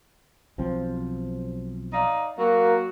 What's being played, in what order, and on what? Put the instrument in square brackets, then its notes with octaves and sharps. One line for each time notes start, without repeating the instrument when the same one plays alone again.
[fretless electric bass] B1 F3 C4
[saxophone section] D#4 D5 F5
[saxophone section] F#3 F#4 [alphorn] A#3